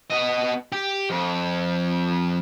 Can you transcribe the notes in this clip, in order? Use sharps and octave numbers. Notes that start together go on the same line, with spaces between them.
B3 D#5
G4
F2